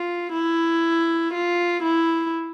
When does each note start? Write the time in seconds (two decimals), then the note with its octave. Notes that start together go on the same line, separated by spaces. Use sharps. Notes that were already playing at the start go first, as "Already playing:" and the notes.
Already playing: F4
0.32 E4
1.34 F4
1.84 E4